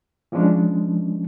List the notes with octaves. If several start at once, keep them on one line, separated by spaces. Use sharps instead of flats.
E3 F3 G#3 C#4 D4